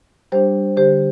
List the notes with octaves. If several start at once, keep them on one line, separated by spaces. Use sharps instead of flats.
G3 D4 G4 C5
D3 G4 C5